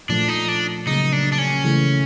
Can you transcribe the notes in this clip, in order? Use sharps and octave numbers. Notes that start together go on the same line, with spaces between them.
A#2 F3 A3 D4
D#4
D4
C#3 F#3 A#3 D#4
D4
D4
C#4
C#3 E3 A3